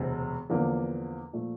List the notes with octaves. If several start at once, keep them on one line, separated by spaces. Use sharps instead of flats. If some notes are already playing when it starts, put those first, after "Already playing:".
Already playing: E1 D2 C3
E2 D3 F3 A#3
A#2 F3 A3